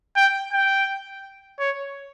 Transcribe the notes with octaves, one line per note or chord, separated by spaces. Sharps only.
G5
G5
C#5